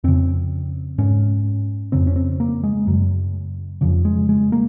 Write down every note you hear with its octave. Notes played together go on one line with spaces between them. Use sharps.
F2 C#3 C4
G#2 C#4
F2 C#3 C4
C#4
C4
A#3
G#3
F#2 C#3 F#3
F2 C#3 F3
G#3
G#3
A#3